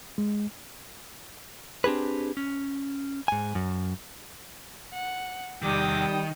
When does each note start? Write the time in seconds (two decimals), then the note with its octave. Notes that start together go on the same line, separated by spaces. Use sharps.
0.18 G#3
1.84 C4 D4 G4 G#4 B4
2.37 C#4
3.28 G#2 G#5
3.55 F#2
4.94 F#5
5.62 E2 C3 D#3 G3 G5 D6 D#6